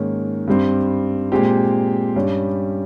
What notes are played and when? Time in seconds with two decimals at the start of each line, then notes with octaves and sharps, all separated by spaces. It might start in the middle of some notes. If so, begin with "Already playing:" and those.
Already playing: G#2 D#3 A#3 C#4
0.47 G2 G3 C4
1.32 A#2 G#3 C4 G4
2.16 G2 G3 C#4